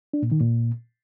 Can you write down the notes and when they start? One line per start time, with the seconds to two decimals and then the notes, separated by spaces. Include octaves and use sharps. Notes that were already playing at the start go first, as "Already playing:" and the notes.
0.13 D4
0.22 A#2
0.31 D#3
0.40 A#2